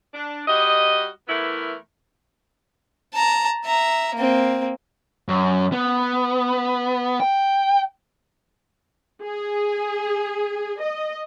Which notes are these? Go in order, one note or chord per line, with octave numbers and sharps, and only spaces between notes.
D4
G3 F#4 D#5
E3 A3 B3 E4 A#4
A5 A#5
E5 A#5
A#3 C4
F#2
B3
G5
G#4
D#5